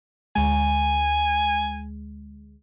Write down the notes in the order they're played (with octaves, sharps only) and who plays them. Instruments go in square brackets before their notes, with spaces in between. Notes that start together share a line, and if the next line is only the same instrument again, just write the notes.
[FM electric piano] D2 G#3 [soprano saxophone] G#5